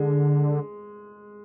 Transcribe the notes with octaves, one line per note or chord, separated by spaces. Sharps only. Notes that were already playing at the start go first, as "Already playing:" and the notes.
Already playing: D3 G#3